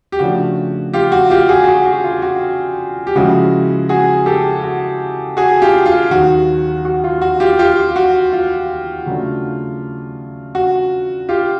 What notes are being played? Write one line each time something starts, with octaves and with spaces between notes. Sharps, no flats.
G4
C#3 F3 A3 D4 F#4
F4 G4
F#4
F4 G4
F#4 G#4
F#4
F#4
F4
F#4
G4
C#3 F3 G#3 C#4 E4 F#4
F#4 G#4
G4 A4
F#4
F#4 G#4
F4 G4
F4
D#2 D#3 F#3 F#4
F#4
F4
F#4
F4 G4
F4 G4
F#4
F4
C#3 F#3 A3 D4
F#4
F4 G4